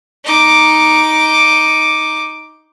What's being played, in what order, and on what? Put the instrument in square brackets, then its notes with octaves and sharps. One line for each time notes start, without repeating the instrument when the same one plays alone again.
[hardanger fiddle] D#4 D6